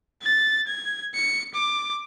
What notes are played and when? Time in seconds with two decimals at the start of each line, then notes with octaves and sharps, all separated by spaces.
0.22 A6
0.67 G#6
1.14 C#7
1.54 D6